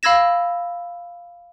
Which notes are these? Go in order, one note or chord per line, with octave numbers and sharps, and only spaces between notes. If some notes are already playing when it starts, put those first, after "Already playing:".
F5 B5 E6 G#6 A#6 E7